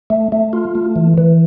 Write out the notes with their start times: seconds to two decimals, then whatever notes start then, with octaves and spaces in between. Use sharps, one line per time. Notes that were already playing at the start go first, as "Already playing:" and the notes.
0.10 A3
0.32 A3
0.53 F4
0.75 A3
0.96 E3
1.18 E3